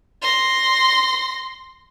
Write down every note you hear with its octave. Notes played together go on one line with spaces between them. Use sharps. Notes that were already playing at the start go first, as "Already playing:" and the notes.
C6 A#6